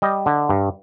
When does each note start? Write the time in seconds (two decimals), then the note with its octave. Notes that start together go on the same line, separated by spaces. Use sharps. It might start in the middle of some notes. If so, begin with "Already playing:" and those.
0.02 G3 D#5
0.26 D3
0.49 G2